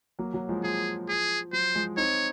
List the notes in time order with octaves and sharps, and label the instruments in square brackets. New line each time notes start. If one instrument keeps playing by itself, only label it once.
[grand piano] F#3 A#3
F#3
F3 G#3
[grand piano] F3 [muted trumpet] G#4
[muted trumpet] G#4
[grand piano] F#3 [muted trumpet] C5
[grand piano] F3 G#3
[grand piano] C4 D#4 [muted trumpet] C#5